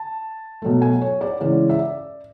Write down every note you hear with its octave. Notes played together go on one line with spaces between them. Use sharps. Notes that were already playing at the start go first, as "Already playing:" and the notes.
Already playing: A5
B2 F#3 A3
G#5
C#5
D5
C#3 E3 G#3 C#4 D5
E5
D5